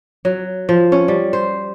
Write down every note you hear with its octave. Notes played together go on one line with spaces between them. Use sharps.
F#3
F3
C#4
G3
C5